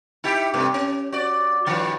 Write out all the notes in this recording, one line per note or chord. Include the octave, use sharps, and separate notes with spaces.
D#4 E4 G4
G2 C3 A3
C#4
F#4 D5
G2 D#3 F3